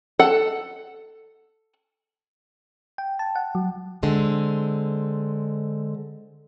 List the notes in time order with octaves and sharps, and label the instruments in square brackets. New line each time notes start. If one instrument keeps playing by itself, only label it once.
[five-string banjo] A4 F#5
[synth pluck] G5
A5
F#5
F#3
[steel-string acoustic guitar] D3 G#3 C4